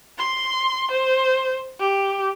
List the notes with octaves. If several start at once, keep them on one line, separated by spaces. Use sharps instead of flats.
C6
C5
G4